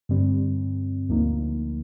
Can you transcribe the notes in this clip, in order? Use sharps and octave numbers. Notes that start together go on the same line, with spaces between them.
G2 D3 G3 C4
D2 D3 F3 A#3 D#4